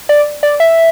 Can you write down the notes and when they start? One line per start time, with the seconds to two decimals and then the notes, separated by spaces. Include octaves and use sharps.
0.09 D5
0.43 D5
0.60 E5